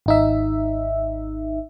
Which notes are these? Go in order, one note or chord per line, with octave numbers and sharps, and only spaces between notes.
G#1 D#4 E5